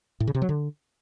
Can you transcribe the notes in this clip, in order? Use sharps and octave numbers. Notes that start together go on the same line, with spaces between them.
A2
C#3
C3
F#3
D3